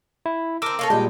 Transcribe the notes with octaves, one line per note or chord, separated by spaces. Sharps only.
E4
C4 A#4 D6 E6
A#3 C#4 A4
A#2 G3 G#3 D#4 G4